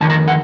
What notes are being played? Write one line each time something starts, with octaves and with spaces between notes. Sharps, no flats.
F2 D#3 A5
A#5
F#5